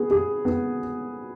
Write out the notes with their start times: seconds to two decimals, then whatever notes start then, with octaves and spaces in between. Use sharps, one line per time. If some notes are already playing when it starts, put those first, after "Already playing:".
Already playing: B3 G#4
0.11 G#4
0.45 B3